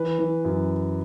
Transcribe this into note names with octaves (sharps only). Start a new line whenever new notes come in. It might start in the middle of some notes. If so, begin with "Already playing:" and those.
Already playing: E3 B4
E3
F#2